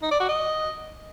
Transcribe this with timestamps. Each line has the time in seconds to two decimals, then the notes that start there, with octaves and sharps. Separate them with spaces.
0.02 D#4
0.11 D5
0.20 F#4
0.29 D#5